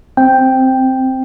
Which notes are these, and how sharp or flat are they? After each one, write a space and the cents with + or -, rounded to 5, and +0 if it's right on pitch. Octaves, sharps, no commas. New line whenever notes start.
C4 +0 G5 +0